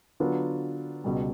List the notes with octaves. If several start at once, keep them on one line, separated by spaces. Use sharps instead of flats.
D3 F#3 B3 D4 F4
C#2 B2 G3